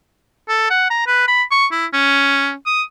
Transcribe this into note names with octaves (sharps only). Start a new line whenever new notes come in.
A4
F#5
A#5
B4
B5
C#6
E4
C#4
D#6